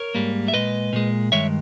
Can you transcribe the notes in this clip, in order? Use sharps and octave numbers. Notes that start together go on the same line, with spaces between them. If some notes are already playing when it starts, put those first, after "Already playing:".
Already playing: A#4 C#5
G#2 G3 A#3
E5
A#2 G#3 B4 D#5
A#2 G#3
G2 D#3 G#3 C#5 E5